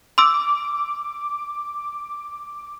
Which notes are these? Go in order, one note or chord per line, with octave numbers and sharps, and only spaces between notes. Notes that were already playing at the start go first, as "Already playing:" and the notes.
C6 D6 E6